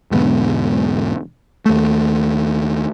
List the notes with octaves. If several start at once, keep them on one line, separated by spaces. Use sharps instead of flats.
E1 G#2 D3 B3
D#2 A3